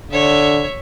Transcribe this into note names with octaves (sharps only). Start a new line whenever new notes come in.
D3 C#5 E5